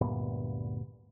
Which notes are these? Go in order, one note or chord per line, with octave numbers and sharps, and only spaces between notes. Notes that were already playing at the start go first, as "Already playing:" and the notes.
D2 G2 A#2 B3